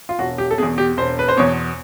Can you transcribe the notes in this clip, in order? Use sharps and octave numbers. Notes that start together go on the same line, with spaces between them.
F4
E1 F#4
G4
A4
E2 B2 G#4
G4
E1 C5
B4
C5
E2 B2 C#5